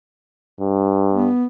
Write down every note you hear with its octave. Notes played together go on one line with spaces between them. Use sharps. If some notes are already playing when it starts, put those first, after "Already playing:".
G2
B3